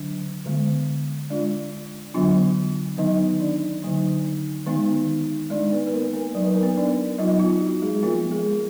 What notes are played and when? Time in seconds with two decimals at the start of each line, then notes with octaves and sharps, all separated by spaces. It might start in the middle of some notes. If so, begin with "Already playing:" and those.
Already playing: D3 F#3 D4
0.45 D3 G#3 B3
1.30 G#3 D4 F4 D5
2.14 D3 F#3 B3 D4 F4
2.98 D#3 F#3 B3 D#4 D#5
3.40 D4 D5
3.83 D3 F#3 A#3 D#4
4.66 D#3 G#3 B3 D#4
5.50 G#3 D4 D#4 D5
5.64 D5
5.72 B3 B4
5.87 B4
5.93 A#3 A#4
6.13 A#3 A#4
6.35 F#3 B3 D#4 D5
6.44 B4
6.54 A#4
6.63 B3 B4
6.77 D4 D5
7.18 F#3 B3 D#4 F4 D#5
7.40 F4
7.61 F#4
7.82 G#3 G#4
8.03 F3 A#3 B3 F4 A#4
8.31 G#3 G#4